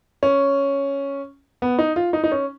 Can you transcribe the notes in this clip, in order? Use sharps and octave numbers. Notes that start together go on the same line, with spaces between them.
C#4
B3
D#4
F4
D#4
D#4
C#4